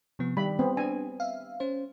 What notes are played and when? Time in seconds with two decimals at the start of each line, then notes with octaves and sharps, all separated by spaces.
0.19 C3 F3 B3
0.37 D#3 G3 B5
0.59 B3 C4
0.77 D4 G#5
1.20 E5 F5
1.60 C#4 C5